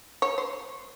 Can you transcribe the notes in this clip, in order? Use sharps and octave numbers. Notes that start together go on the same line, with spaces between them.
C#5
C5